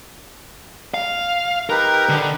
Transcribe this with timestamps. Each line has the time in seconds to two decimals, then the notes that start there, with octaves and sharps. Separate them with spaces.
0.94 F5
1.70 D#4 G4 A#4 B4
2.09 D3